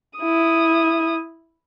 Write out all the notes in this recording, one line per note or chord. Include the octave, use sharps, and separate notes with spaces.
E4 D#6